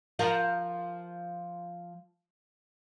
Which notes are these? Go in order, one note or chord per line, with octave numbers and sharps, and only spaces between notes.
F3 F4 A#4